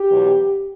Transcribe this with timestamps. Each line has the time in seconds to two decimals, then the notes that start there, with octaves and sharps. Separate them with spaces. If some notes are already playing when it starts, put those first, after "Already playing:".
Already playing: G4
0.10 E2 B2 F#3